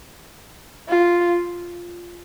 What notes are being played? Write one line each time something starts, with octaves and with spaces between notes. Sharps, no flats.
F4